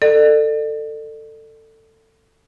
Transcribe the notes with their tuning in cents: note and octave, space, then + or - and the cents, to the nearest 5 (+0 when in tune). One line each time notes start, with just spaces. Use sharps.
A4 +20 D5 +40